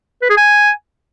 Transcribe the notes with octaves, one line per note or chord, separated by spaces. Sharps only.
B4
G#4
G#5